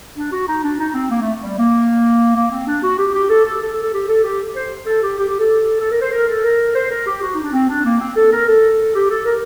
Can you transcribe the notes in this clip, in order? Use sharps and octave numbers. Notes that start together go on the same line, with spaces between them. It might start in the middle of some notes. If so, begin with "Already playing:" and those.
D4
F#4
D#4
D4
D#4
C4
A#3
A3
G3
A#3
A#3
C4
D4
F#4
G4
G4
A4
A4
A4
A4
A4
G4
A4
G4
C5
A4
G4
G4
G4
A4
A4
A#4
C5
A#4
A4
A#4
C5
A#4
G4
F#4
D#4
D4
C4
D4
A#3
C4
A4
A#4
A4
G4
A4
A#4